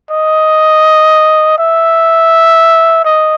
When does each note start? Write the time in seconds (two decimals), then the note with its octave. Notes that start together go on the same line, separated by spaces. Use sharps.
0.10 D#5
1.58 E5
3.05 D#5